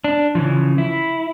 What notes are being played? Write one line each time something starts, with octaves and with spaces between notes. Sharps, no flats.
D4
C#3 E3 F3
E4